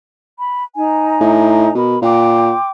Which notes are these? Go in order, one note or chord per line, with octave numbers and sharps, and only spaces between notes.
B5
D#4 G#5 A#5
A2
B2 A#4 B5
A#2 G5 C6 D6